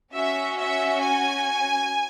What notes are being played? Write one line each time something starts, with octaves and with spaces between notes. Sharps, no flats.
C#4 F#4 E5
E5
G#5